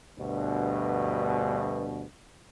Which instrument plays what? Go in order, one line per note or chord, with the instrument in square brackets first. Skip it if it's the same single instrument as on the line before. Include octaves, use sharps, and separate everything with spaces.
[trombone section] D2 G2 B2